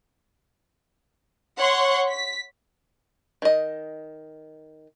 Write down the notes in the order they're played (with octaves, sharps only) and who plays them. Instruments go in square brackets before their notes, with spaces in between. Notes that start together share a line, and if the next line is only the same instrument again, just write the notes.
[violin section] C#5 F#5 C6 C#6
B6
[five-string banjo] D#3 D#5